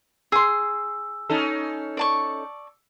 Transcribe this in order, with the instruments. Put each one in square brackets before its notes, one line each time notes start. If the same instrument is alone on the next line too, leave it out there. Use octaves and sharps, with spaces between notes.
[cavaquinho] G#4 C6 [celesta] E6
[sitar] C#4 D#4 A4
[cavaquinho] D5 A5 C#6